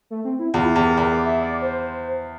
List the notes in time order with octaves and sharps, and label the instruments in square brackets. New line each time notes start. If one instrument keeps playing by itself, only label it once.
[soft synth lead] A3
C4
E4
[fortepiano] E2 [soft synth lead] F4
[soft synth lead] E4
[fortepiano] E2 [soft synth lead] G4
[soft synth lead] A#4
[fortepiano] E2 [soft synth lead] A#4
[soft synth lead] D5
E5
D5
C5